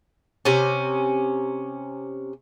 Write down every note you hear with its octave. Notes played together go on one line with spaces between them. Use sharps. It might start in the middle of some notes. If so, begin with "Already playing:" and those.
C3 C#4